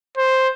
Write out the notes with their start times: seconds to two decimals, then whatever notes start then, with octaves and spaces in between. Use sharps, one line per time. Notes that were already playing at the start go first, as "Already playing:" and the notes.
0.18 C5